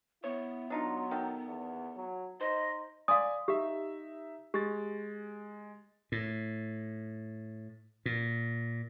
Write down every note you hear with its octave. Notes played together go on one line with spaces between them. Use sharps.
B3 E4 C#5
F#3 D4 D#4 F4
D#3 A4
E2
F#3
D#4 C5 D#5
D5 F5 G#5 C6 D#6
D#4 G4 E5
G#3 G4 A6
A2
A#2